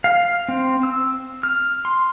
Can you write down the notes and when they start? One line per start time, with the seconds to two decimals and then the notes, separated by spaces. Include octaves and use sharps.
0.04 F5
0.49 C4
0.83 E6
1.43 F6
1.85 C6